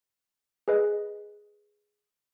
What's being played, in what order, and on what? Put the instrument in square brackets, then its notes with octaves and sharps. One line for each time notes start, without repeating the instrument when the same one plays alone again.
[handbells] G#4 B4 D#5